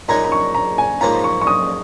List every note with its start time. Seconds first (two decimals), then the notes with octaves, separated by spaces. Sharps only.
0.08 A#2 G#3 D#4 C#5 A#5
0.24 A#5
0.32 C#6
0.55 A#5
0.78 G#5
1.01 G#2 F3 A#3 C#4 F4 A#5
1.24 C#6
1.41 C#6
1.47 D#6